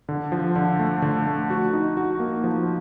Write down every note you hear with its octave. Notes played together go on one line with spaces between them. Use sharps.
D3
F3
D3
A3
D3
A3
F#4
D#4
F#4
A#3
F3